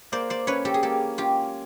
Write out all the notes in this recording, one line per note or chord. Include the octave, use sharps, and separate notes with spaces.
A#3 C5 D5
C5 D5
C#4 B4 C#5
G4 A4
G#4
A#3 G4 A4
C#4 F4 G4